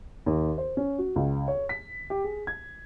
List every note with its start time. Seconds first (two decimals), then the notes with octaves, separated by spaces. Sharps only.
0.26 D#2
0.58 C5
0.77 C#4
0.98 F#4
1.16 C#2
1.48 C#5
1.69 B6
2.10 G4
2.24 G#4
2.47 G#6